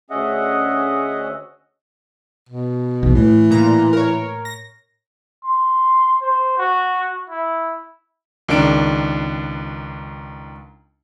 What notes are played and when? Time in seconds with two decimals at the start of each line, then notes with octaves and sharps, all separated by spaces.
0.10 D2 C#4 G#4 D#5 E5 F#5
2.49 B2
3.03 B1 E2
3.15 A2 E3
3.51 A#2 A#5
3.93 A#4 C#5
4.45 A#6
5.44 C6
6.21 C5
6.58 F#4
7.30 E4
8.48 C#2 D#3 D4 D7